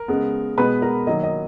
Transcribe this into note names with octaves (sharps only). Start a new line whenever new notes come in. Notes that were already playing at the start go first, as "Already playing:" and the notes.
Already playing: A#4
C#3 G#3 B3
B2 G#3 B3 B4 B5
A#4 A#5
D#3 F#3 A#3 D#5
D#5